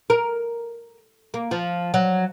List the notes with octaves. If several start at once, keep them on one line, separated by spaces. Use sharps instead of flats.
A#4
A#3
F3
F#3